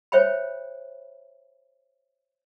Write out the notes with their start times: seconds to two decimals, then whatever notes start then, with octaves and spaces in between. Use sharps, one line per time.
0.12 C5 C#5 E5 G5 B5